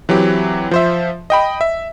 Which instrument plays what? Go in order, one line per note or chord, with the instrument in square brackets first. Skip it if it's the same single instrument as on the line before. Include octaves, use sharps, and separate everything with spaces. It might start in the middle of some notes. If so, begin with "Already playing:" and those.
[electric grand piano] E3 F#3 C4 G4
F3 C5 E5
D#5 G5 B5
E5